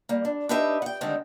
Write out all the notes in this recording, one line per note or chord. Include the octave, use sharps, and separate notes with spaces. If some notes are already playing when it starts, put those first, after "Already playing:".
G3 A#3
D4
D4 D#4 G4 B4 D#5 E5
F#5 G5
D3 D#3 G3 G#3 C4